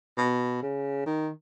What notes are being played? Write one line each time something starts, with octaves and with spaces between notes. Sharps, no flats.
B2
C#3
D#3